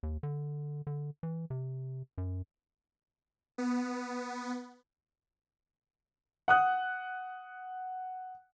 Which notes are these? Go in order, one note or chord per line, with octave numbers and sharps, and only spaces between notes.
D#2
D3
D3
E3
C3
F#2
B3
F#5 D#6 F#6